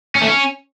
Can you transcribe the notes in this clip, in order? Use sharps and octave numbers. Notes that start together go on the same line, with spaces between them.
C#4
A3
C#4